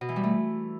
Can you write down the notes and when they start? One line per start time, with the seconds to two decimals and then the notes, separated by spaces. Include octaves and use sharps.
0.01 B2
0.09 E3
0.16 G3
0.23 A3